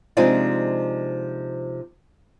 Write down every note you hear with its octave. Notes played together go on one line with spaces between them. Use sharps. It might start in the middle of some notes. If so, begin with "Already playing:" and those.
C3 F3 G#3 D4 D#4 F4